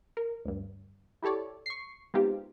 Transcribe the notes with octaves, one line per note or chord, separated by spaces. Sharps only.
A#4
D2 G2
E4 G4 A4 C#5 D5
C#6 C7
G#3 B3 C4 D#4 F4 G4